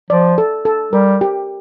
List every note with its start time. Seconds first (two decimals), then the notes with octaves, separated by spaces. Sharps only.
0.10 F3 D5
0.38 A4
0.65 A4
0.93 G3 A#4
1.21 G4